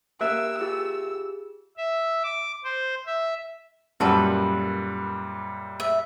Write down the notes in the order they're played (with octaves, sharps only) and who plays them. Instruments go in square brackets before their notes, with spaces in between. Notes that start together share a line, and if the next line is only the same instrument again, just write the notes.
[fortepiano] A#3 E5 [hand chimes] G4 F#6 D7 [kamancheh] E6
[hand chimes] F4 G4 G#4
[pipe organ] E5
D6
C5
E5
[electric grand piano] F#2 A#2 G3 [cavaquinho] F#4 A4 B4
[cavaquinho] E5